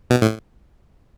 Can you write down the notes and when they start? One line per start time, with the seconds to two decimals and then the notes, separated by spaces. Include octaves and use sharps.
0.10 B2
0.22 A2